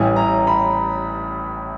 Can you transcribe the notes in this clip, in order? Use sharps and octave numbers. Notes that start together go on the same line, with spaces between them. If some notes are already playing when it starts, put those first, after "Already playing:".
Already playing: A1 A2 E3 G3 G#5
A#5
B5